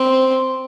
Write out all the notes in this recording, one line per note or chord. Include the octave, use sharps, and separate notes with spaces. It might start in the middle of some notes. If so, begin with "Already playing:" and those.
Already playing: C4